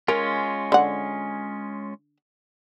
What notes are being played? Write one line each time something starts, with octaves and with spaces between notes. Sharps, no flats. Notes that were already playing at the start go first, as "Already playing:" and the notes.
G#3 C#4 F4 A#4
D3 F#5